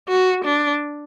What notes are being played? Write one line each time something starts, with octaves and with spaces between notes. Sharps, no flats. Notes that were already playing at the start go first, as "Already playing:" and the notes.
F#4
D4